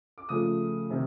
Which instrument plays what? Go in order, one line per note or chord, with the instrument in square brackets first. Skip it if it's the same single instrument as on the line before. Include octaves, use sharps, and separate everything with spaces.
[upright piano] D6
C#3 F3 A3 D#6
C3 D#3